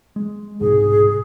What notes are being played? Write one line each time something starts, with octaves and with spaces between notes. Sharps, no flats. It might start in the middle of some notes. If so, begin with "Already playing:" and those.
G#3
C2 G#2 B2 G#4